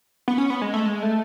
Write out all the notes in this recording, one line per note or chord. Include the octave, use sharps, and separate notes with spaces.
B3
C#4
B3
G#3
A3
G#3
A3